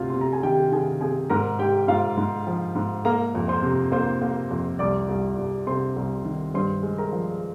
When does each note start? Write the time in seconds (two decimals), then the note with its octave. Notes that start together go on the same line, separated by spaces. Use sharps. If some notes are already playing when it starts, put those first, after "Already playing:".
Already playing: D2 C3 F4 F5
0.10 C3 C6
0.21 A#5
0.33 G#5
0.43 D#3 G4 G5
0.72 D#3 G#4 G#5
1.01 C3 G#4 G#5
1.30 G#2 A#4 A#5
1.59 G#2 G4 G5
1.88 G#2 F4 F5
2.17 G#2
2.47 F3
2.75 G#2
3.05 A#3 A#4 A#5
3.35 F2
3.48 C5 C6
3.63 C3
3.92 A#3 C5 C6
4.22 A#3
4.51 F2
4.79 C2 D5 D6
5.09 C2
5.38 C2
5.67 C3 C5 C6
5.96 C2
6.25 D#3
6.54 G2 C5 C6
6.83 G#3
6.98 A#4 A#5
7.13 F3